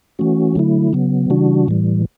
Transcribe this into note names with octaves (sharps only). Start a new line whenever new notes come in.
E3 A3 C#4 F#4
D3 F#3 A3 E4
C#3 F#3 B3
C#3 E3 G3 D4 F#4
A2 E3 G3